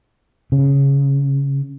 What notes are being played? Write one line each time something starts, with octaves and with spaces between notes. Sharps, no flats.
C#3